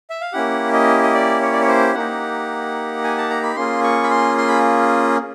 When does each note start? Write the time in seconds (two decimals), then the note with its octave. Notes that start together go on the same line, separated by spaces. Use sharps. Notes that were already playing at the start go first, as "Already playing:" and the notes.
0.10 E5
0.21 F5
0.33 A#3 C#4 E4 G4 F#5
0.73 D#5
1.03 D#5
1.14 D5
1.41 C#5
1.53 D5
1.61 C#5
1.68 C5
1.94 A#3 D#4 G4 F#5
3.04 G#5
3.17 A5
3.30 A#5
3.43 B5
3.56 A#3 C#4 F4 G#4 C6
3.84 C#6
4.03 B5
4.10 C6
4.38 C6
4.48 B5